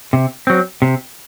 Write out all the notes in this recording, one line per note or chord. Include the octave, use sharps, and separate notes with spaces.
C3
F#3 C4
C3